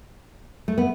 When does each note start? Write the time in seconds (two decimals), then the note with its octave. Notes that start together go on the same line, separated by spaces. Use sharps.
0.68 A3
0.78 B3